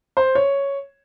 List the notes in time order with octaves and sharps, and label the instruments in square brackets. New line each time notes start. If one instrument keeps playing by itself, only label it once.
[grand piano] C5
C#5